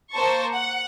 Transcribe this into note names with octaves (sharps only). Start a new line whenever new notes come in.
A#3 C5 A5 C#6
F#5